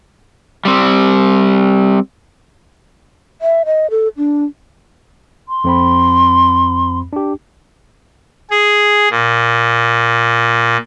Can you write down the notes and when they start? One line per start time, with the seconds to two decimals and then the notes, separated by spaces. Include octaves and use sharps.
0.65 G3 C4
3.42 E5
3.66 D#5
3.90 A4
4.17 D4
5.49 C6
5.64 F2 C4 B5
7.13 D4 G4
8.50 G#4
9.11 A#2